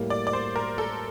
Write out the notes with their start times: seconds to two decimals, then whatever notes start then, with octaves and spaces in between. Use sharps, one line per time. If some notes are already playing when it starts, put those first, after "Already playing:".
Already playing: A2 G3 A#3
0.10 D5
0.27 D5
0.33 C5
0.56 A#4
0.78 A4